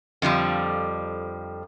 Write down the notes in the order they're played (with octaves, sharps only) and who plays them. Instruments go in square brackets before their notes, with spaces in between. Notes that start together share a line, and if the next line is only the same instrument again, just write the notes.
[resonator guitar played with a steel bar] F2 D3 F3 G3